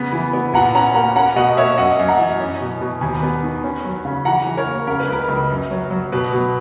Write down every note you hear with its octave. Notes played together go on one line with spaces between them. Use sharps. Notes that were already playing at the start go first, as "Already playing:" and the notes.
Already playing: C#3 B3
E3
B3
A#2 F#5 A#5
C#4 F#5 A#5
A#3 F#5 A#5
C#4 F#5 A#5
B2 D#5 F#5
A#3 C#5 E5
F#2 D#5 F#5
F#2
F#5 A#5
E3
C#4
B2
B2
D#2 G#5 B5
B3
D#3
C#4
F#3
C#3
E3 F#5 A#5
E3
A#4 C#5
A#3
C#3 A#4
B4
C#2 A#4
C#2
F#2
F#3
F#3
B2 B4
B2